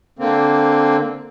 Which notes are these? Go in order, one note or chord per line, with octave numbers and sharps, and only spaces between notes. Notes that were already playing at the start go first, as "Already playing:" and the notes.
D3 A#3 C4